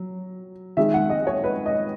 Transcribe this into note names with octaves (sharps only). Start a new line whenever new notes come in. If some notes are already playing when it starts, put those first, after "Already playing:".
Already playing: F#3
D#3 G#3 E5
F#5
D#5
C#5
B4
D#5